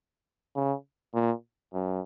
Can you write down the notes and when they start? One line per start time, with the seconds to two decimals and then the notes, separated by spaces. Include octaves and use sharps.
0.56 C#3
1.14 A#2
1.74 F#2